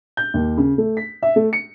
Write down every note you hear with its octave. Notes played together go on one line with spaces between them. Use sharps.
G6
D#2
C#3
A3
B6
E5
A3
C#7